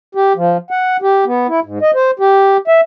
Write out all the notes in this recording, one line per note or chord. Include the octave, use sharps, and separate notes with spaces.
G4
F3
F#5
G4
B3
E4
G#2
D#5
C5
G4
E5